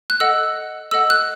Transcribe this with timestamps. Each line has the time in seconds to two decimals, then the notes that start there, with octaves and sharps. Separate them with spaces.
0.10 F#6
0.20 A4 D#5 F#5 E6
0.91 A4 D#5 F#5 E6
1.10 F#6